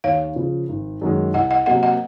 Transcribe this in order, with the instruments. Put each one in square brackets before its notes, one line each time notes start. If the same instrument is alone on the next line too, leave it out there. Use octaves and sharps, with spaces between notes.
[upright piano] D#2 [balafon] C#5 F5
[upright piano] C#3 F3
G#1
F#2 D#3 G#3
[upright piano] C2 [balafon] D#5 F#5
[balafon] D#5 F#5
[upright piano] C3 F#3 A#3 [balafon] D#5 F#5
[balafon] D#5 F#5